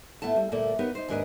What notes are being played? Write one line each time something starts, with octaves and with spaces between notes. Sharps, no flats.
A2 A3 B3 E4 A5
G3
D2 A#2 A3 A#3 A4 D5
B3 D#4 G4 A#4 C#5
D#4 C5
D#2 G#2 D4 A#4 B4 D#5